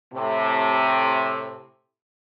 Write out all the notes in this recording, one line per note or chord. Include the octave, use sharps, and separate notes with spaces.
A2 C3